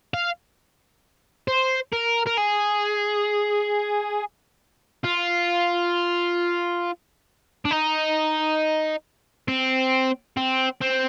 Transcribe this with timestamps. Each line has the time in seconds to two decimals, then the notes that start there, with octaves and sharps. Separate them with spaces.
0.14 F5
1.48 C5
1.93 A#4
2.26 A#4
2.37 G#4
5.04 F4
7.65 D4
7.71 D#4
9.48 C4
10.37 C4
10.82 C4